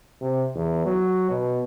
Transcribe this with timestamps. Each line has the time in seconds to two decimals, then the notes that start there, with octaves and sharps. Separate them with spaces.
0.21 C3
0.55 E2
0.85 F#3
1.30 B2